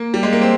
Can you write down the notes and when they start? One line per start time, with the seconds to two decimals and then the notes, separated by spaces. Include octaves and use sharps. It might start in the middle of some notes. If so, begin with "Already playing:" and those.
Already playing: A#3
0.14 G3
0.23 G#3
0.33 A#3
0.42 C4